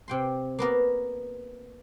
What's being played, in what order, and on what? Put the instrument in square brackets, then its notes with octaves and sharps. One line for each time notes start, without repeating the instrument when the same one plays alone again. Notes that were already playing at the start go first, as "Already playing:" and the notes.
[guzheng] C3 G5 C6
A#3 B3 A#4